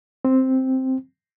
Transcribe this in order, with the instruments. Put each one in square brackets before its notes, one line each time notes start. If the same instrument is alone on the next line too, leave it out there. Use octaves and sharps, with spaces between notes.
[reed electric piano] C4